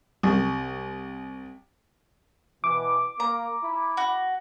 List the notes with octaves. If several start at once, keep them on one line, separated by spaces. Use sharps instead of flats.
C2
B2 E3 D6
A#3 A#5
E4 B5
F#4